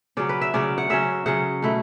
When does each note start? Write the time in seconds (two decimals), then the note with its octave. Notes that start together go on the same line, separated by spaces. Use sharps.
0.17 C#3 F#3 C#4 D5
0.29 B4
0.41 E5
0.54 C#3 F#3 C#4 D5
0.78 F#5
0.90 C#3 F#3 C#4 E5
1.26 C#3 F#3 C#4 F#5
1.62 B2 A3 E4